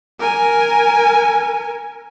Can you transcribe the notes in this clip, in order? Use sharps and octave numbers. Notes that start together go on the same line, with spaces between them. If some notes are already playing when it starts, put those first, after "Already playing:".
A#4 G#5